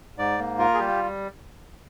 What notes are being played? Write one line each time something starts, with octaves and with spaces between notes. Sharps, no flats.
G#2 D5
A#3
F4 A#4
G#4
G3 G4